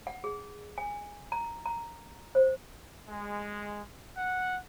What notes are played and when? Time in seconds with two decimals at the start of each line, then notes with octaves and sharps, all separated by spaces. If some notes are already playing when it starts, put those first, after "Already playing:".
0.07 F#5
0.24 G#4
0.78 G#5
1.32 A#5
1.66 A#5
2.35 C5
3.08 G#3
4.16 F#5